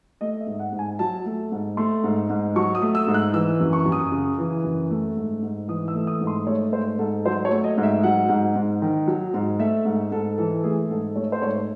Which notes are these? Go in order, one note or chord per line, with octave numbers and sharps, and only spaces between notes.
A3 D#5
E5
G#2
F#5
G#2
G#5
F#3 A5
A3
G#2
A3 C6
G#2
G#2
F#3 C#6
D#6
A3
E6
G#2
F#6
E3 E6
F#2
C#6
F#2
D#6
C#3
E3
F#2
A3
G#2
G#2
E3 D#6
E6
A3
D#6
G#2
C6
A3 C#5
G#2 C5
G#2 A4
F#3 C5
C#5
A3
D#5
G#2
E5
F#3 F#5
G#2
G#2
D#3
F#3
G#2
A3 E5
G#2
G#2 A4
E3 A4
A3 G#4
G#2 A4
A3 C#5
C5
G#2 C#5